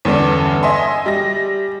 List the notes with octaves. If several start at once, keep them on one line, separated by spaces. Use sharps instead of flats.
E2 G2 D3 C#4 D4
D#5 E5 G#5 C6
G3 A#6